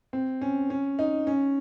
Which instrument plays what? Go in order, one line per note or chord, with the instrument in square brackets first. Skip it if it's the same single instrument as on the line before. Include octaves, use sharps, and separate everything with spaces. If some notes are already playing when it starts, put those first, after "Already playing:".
[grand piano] C4
C#4
C#4
D#4
C#4